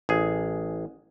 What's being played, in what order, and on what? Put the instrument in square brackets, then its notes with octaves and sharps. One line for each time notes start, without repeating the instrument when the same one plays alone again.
[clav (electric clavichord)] A1 G#4